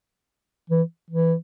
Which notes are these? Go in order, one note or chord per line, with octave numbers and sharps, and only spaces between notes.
E3
E3